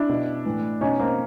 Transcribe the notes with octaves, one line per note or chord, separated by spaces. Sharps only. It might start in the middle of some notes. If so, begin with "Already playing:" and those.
Already playing: D4 E4
B2
A2 E3
B2 C#4 D#4
A#3 C4